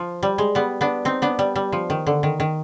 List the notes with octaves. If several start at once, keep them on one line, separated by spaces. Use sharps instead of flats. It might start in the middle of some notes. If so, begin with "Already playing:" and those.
Already playing: F3
G3
G#3
G3 B3
B3 D4
C4 D#4
B3 D4
G3
G3
F3
D#3
D3
D#3
D#3